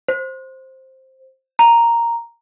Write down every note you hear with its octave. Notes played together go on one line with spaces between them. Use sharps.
C5
A#5